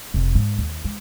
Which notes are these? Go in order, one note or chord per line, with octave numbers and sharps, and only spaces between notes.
F1
G#2
D#2
G#3